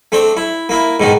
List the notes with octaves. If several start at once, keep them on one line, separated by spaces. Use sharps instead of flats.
A3 C4 D4 C5
E4
A#3 E4
G#2 B2 D#3 D#4